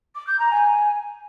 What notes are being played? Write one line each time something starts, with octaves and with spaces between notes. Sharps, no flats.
D6
G6
A#5
G#5